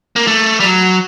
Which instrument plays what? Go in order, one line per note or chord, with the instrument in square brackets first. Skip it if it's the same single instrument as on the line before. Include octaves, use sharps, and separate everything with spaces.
[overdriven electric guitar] A#3
A3
G3
F#3